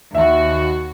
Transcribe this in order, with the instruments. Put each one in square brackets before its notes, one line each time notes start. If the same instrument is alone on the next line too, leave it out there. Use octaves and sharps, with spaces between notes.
[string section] D#2 F#4 [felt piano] E5